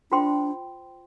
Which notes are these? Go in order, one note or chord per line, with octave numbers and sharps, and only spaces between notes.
D4 F4 C5 G5 C6